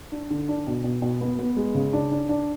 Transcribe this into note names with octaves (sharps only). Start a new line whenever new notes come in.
D4
D3
D4
B2
B2
B2
B3
B3
G#3
C#3
D4
D4
D4